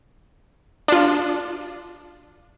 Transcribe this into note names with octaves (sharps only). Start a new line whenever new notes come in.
D4 F4